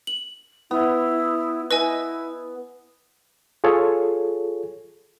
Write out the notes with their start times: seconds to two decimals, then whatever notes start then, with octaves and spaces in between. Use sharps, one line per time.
0.07 F#7
0.71 B3 E4
1.71 E4 B4 D#5 G#5
3.64 F4 G#4 A4 C#5